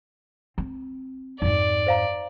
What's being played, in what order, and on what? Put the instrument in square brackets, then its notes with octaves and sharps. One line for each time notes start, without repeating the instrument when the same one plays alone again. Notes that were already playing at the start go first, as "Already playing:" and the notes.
[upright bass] C4
[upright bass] F2 G#2 [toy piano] D#4 [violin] D5
[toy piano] C5 F5 A#5